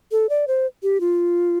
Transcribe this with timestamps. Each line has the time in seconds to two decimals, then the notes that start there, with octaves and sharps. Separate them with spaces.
0.12 A4
0.29 D5
0.48 C5
0.83 G4
1.00 F4